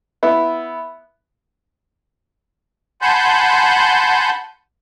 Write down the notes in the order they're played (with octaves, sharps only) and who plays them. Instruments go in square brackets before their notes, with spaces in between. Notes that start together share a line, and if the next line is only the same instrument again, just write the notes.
[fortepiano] B3 E4
[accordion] F#5 G#5 A5 B5 C6 G6